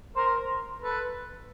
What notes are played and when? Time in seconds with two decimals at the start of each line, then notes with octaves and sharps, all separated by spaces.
0.16 A#4 C5
0.81 A4 B4